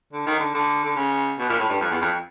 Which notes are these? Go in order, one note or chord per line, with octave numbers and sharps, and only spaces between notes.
D3
D#3
D3
D3
D3
C#3
B2
A#2
A2
G2
F2
E2
F2